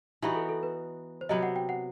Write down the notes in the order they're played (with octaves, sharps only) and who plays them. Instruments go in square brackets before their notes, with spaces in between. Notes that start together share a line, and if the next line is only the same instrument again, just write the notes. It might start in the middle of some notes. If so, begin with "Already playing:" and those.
[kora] E3 B3 D#4 F#4 [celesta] G4
[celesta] A4
A4
B4
C5
[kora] C3 F#3 B3 [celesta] D#5
[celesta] F#5
G5
F#5